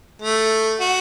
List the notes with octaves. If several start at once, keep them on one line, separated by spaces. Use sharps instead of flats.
A3
F#4